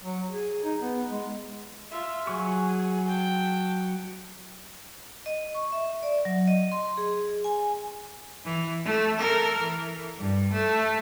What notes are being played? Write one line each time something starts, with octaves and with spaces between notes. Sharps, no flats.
F#3
G#4
D#4
B3
G#3
F4 E5
F#3 G#4 C#6
G5 A5
D#5
C#6
E5
D5
F#3
D#5
C6
G#4
G#5
E3
A3
A4 A#4
E3
G2
A3